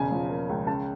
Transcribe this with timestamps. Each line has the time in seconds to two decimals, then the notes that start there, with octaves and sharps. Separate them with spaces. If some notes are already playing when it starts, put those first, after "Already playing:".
Already playing: E1 C#3 G#5
0.11 F3
0.30 A#3
0.49 C#2
0.67 C#3 A5